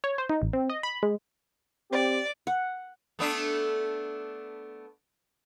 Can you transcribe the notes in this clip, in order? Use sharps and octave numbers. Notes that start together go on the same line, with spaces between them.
C#5
C5
D#4
A1
C4
D#5
B5
G#3
C4 G4 D5
F#5
A3 B3 D4